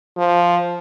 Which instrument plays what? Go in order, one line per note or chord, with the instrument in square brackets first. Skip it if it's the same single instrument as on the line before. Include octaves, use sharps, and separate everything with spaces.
[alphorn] F3